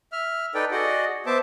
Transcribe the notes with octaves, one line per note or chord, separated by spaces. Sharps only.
E5 F6
D#4 A4 B4 D5 G5
F#4 G#4 D5 D#5 F#5
B3 C5 E5 A5 D6